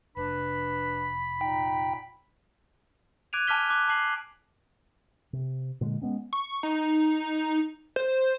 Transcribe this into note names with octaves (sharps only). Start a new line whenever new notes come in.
F1 D4 B4 B5
A#2 D#4 G5
D6 F#6 G#6 D7 D#7 F7
G#5 A5 D6 F6 B6 G7
D6 F#6
A5 D6 C7 F#7
C3
A#2 D3 G#3
G#3 B3 C#4
C#6
D#4
C5